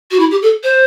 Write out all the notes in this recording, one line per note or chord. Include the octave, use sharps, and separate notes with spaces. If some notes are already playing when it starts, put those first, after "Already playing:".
F#4
E4
G4
A4
C5